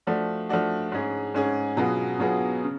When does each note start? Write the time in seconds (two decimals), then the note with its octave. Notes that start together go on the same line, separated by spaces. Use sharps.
0.07 F3 A3 D4 F#4
0.49 F3 A3 D4 F#4
0.92 G#2 G#3 C#4 G#4
1.34 G#2 G#3 C#4 G#4
1.77 B2 F#3 B3 F4 G#4
2.19 B2 F#3 B3 F4 G#4
2.63 C#3